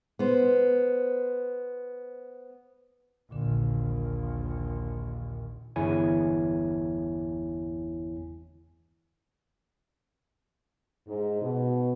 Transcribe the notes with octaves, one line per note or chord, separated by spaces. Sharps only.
B3 C5
A#1 D#2 A#2 D3
G1 E2 E4 C#5 G#5
G#2
B2